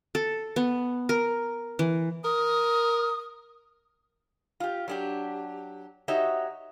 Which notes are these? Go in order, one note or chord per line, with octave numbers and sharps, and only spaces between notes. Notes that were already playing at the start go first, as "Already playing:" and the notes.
A4
B3
A#4
E3
A#4 D#6
F4 G4
F#3 D4 G4
D#4 F#4 G4 C#5 D#5 E5